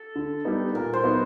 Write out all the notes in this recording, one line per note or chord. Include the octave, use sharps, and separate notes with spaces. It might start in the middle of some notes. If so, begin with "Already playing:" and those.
Already playing: A4
D3
G3 B3 D#4
A#2 A#4
C5
F#3 B3 D#4